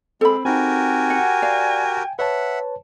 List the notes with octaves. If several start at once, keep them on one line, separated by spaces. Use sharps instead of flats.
G#3 C4 A4 B5
C4 D#4 F#4 G4 A#4 G#5
F#5
D5 F5
G5
B4 C#5 E5 F#5 A5